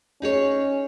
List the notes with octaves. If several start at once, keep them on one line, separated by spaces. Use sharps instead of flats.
C#4 D#4 G#4 C#5